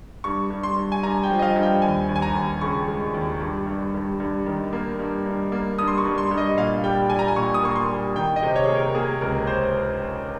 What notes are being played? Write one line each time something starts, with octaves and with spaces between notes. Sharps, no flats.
G2 C#6
G2
C6
G2
G#5
G2 A#5
G5
F3
D#5
F5
G2
G5
D#2 G#5
D#2
G#5
A#5
D#2
C#3 C#6
G#3
D#2
G2
G2
G2
G2
D#3
A#3
G2
G2
A#3
G2 D#6
C6
C#6
G2
C6
G2
D#5
A#2 F5
G3 G5
G3 G#5
A#5
G#5
A#2 C#6
D#6
A#3 C#6
C6
G3
D#3 G5
D#5
C3
C#5
A#3 G#4
A#4
A#3 G#4
C#2 A#4
C5